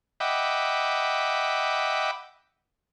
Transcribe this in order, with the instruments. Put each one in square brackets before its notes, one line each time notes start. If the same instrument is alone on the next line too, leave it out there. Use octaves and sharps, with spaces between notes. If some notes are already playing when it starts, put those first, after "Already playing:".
[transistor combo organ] D#5 E5 F#5 G5 B5 D6